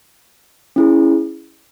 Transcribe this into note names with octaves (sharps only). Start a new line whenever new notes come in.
C#4 E4 G#4